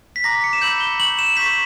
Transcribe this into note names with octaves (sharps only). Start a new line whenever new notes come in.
B6
A#5 D6 F#6 A#6
B6
C#7
E7
B5 E6 G6 F#7
G7
C#6 G6 F#7
E7
C#6 G6 B6